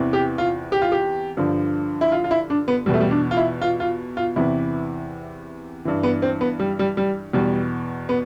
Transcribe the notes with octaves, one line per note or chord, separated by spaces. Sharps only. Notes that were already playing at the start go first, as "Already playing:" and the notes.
Already playing: E2 C3 E3
G4
F4
G4
F4
G4
G2 D3 F3
E4
F4
F4
E4
D4
B3
E2 B2 G3
A3
G3
D4
F4
E4
F4
F4
F4
E2 C3 E3 E4
G2 E3
B3
C4
B3
G3
G3
G3
E2 B2 G3
B3